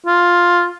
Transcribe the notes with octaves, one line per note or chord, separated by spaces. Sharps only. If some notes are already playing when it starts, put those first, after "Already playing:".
F4